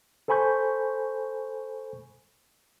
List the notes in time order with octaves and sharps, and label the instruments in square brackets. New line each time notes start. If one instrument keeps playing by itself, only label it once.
[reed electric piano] A4 C5 G#5 B5 C#6 G6